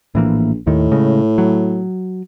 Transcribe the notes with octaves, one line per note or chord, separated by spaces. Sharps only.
A#1 A2 E3 A#3
D#2 A2 D#3
C#3 G#3
F#3